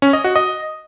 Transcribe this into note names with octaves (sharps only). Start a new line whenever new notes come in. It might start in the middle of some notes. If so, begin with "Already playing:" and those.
C#4
D#5
F#4
D#5